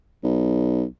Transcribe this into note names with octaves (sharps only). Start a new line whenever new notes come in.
B1